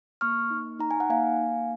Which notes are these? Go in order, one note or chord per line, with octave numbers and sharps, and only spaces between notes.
A#3 C#6 F6
D#4
D#4 A#5
G#5
F#5
A#3 F5 G#5
A#3